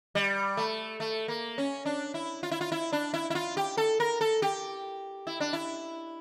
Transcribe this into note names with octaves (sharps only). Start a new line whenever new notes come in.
G3
A3
A3
A#3
C#4
D4
E4
F4
E4
F4
E4
D4
E4
E4
F4
G4
A4
A#4
A4
G4
E4
D4
E4